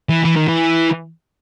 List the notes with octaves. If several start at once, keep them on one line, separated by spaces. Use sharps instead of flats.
E3
E3
D#3
E3